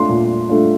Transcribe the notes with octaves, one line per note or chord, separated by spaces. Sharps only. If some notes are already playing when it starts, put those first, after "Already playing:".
Already playing: A3 D4 F4 C6
A#2
A3 D4 F4